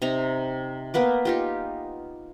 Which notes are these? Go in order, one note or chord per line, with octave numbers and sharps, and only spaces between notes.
C3 D#4 A#5
A#3 B3 B4 D6
D#4 F4 G4